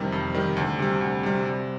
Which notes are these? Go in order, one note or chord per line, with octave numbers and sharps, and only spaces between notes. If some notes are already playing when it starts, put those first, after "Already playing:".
Already playing: F2 C3 D#3 G3
F2
C3 D#3 G3
D2
C3 G3
D2
C3 G3
C3